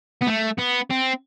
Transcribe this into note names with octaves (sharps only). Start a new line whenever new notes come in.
B3
A3
B3
C4